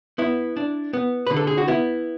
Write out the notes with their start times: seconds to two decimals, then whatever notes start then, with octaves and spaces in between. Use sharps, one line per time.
0.18 B3 E4
0.57 D4
0.93 B3
1.27 D3 B4
1.37 A4
1.47 G#4
1.57 F#4
1.68 B3 E4